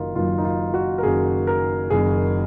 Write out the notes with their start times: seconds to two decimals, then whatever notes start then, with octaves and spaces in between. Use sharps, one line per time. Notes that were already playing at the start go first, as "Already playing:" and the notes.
Already playing: F#1 F#2 D#3 F#3 D#4 F4 A#4
0.15 F#1 F#2 D#3 F#3 F4
0.38 D#4
0.45 F4
0.74 F#4
0.98 A#4
1.03 F#1 F#2 D#3 F#3 G#4
1.47 A#4
1.90 F#1 F#2 D#3 F#3 G#4